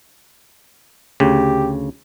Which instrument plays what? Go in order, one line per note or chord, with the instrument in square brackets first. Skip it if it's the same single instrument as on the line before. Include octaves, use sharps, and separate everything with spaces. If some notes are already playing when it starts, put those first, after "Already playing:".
[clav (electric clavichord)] D2 C#3 [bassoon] G4